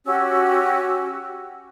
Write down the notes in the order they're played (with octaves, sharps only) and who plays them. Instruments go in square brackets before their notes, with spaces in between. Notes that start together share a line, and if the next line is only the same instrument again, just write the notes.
[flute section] C#4 F#4 G4 E6